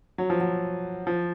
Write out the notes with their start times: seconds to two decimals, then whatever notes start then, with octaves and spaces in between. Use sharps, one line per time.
0.18 F#3
0.30 F3
0.40 F#3
1.07 F3